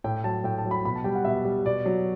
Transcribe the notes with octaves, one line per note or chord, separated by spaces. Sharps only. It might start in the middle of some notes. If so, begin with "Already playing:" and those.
A2 G5
F#3 A5
A2 G5
A5
F#3
B5
B2 B5
A5
G3 G5
F#5
B2 E5
G3
B2 D5
F#3